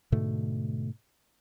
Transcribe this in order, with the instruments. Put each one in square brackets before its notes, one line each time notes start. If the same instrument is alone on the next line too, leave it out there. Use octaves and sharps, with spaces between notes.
[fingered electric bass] G#2 B2 D3 A3